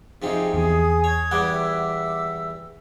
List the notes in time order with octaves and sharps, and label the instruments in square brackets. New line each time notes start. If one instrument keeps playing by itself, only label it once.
[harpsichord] F2 C3 C4 [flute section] D#4 G#4 F5
[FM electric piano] E2 [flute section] G#4 G#5 D#6
[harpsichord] C#5 [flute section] D#6 G#6
[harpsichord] E2 G3 C5 [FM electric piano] F#5 D6
[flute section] E5 E6